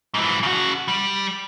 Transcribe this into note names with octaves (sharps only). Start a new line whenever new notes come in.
G#2 E3
C#3 F#4
G3